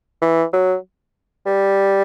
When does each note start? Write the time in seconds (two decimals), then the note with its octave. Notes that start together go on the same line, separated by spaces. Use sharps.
0.21 E3
0.53 F#3
1.46 G3